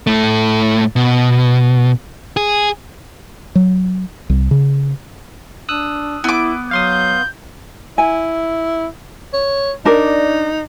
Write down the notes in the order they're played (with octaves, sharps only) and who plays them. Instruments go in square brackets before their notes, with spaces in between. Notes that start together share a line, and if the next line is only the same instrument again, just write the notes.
[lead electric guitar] A2 A3
B2
G#4
[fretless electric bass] F#3
C2
C#3
[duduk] D4 [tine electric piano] D#6 E6 F#6
[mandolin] B3 D6 [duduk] E4
[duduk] F#3 [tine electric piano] F5 C6 D#6 [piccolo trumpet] G6
[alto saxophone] E4 [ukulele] G#5
[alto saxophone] C#5
[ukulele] D4 A#4 D5 [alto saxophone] D#4